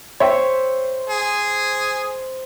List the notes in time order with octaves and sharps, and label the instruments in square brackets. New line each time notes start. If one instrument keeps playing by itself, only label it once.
[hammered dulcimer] C5 [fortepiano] C#5 E5 G5
[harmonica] G#4